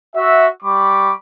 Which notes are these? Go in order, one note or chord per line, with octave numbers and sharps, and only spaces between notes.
F#4 E5
G3 B5 C#6 D6